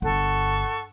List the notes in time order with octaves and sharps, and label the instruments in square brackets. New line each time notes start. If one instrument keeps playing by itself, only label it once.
[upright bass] G1 [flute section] A4 F#5 C#6